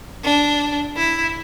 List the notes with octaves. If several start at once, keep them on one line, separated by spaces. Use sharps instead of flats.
D4
E4